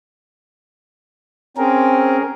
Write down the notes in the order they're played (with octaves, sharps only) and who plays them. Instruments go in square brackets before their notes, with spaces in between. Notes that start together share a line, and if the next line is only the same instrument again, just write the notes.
[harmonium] C4 [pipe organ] C#4 G#4 A#4